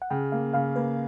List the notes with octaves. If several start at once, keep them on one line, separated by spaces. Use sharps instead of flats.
F#5
C#3 G5
A#3 F5
C#3 F5
A#3 B4